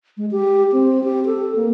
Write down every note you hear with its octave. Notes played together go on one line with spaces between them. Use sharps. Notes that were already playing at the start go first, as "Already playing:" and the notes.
G#3
G4
C4
G4
A4
A#3